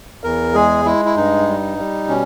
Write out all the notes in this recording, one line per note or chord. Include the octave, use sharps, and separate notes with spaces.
E2 A#4
G#3 G#4
G#3 E4
E4
G2 D#4
G3
G3
B2 C#4